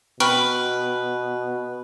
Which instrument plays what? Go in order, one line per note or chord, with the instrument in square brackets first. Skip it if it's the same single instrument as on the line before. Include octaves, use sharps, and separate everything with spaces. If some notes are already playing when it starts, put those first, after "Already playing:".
[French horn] B2 [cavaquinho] B4 [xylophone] G5 C#6 F6